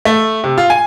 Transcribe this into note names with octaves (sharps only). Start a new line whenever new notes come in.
A3
C3
F4
G#5